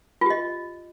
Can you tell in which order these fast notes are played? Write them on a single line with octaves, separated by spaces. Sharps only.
F4 G4 D#5